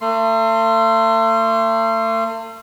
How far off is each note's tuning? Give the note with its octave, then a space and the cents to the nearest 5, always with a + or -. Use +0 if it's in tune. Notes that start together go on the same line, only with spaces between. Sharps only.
A3 +40 C6 +0